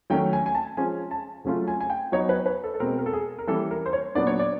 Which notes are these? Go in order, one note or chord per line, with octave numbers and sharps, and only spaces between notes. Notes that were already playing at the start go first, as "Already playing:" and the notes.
D#3 F#3 A3 C#4 G5
G#5
G#5
A5
F3 G#3 C#4 F4 G#5
A5
C#3 F#3 A3 C#4 F4
G#5
G#5
G5
F#3 B3 D#4 C#5
B4
B4
A4
A4
B2 G#3 C4 A#4
A#4
A4
G#4
A#4
E3 G3 A#3 C#4 A4
A#4
C5
C#5
A#2 F#3 B3 D4 D5
C#5
D5